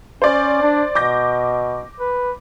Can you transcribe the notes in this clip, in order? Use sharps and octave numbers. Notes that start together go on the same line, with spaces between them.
C#4 C5 D5
D4
B2 D6 G6 A#6
B4